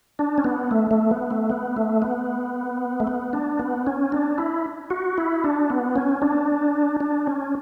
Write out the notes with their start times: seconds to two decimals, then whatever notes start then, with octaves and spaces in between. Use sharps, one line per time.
0.19 D4
0.38 C#4
0.44 B3
0.71 A3
0.91 A3
1.11 B3
1.31 A3
1.50 B3
1.77 A3
2.02 B3
3.00 A3
3.07 B3
3.33 D4
3.59 B3
3.87 C#4
4.12 D4
4.38 E4
4.90 F#4
5.18 E4
5.44 D4
5.70 B3
5.96 C#4
6.22 D4
7.00 D4
7.27 C#4